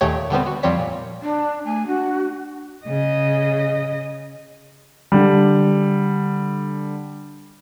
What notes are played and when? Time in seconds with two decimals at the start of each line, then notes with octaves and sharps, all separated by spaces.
0.01 D#2 A#2 D#3 A3 G4 C#5
0.30 D3 G3 B3 C4
0.46 F#4
0.63 F2 F3 G3 C4 C#5 B6
0.79 A#2
1.21 D4
1.65 A3 G#5
1.87 D4 F#4
2.86 C#3 D#5
5.12 D3 G3